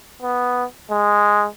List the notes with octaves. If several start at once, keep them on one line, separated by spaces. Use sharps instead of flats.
B3
G#3